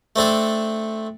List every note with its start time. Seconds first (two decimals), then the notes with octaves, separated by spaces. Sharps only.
0.16 A3 C4 D4 A4